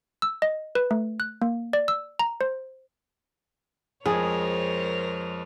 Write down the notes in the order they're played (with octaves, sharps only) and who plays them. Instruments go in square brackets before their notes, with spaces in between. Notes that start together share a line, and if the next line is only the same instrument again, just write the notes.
[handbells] E6
D#5
B4
A3
F#6
A#3
D5
E6
A#5
C5
[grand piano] F2 G#3 [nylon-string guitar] G#4 [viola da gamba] A#4 C5 C#5